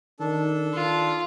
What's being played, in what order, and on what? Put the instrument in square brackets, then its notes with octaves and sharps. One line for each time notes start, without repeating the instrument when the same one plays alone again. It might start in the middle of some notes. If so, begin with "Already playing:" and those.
[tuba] D#3 [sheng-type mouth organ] D4 A4
[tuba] D#3 [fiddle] F4